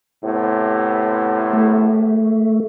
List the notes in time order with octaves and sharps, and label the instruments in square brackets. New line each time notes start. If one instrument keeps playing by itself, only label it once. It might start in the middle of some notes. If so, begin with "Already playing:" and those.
[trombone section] A2 C3 B3
[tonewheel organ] A3